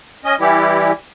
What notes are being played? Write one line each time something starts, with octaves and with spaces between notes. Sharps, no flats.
C#4 D#5
E3 G3 E4 G4